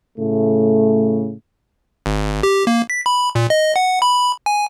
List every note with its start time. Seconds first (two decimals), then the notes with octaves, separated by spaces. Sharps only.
0.18 A2 C#3 A3
2.06 G#1
2.43 G4
2.67 A#3
2.90 B6
3.06 B5
3.35 A#2
3.50 D#5
3.76 F#5
4.02 B5
4.46 G#5